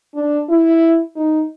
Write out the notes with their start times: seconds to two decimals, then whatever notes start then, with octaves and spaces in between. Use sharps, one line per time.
0.15 D4
0.49 E4
1.16 D#4